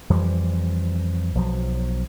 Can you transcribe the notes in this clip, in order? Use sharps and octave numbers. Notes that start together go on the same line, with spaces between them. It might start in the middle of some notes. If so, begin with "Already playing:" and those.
F2 E3 F3 G3
B1 F3 F#3